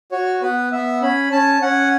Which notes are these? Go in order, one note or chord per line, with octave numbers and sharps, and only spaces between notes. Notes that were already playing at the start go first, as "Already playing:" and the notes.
F#4 C#5
B3 B4
B3 E5
C#4 B5
C#4 A5
C#4 F#5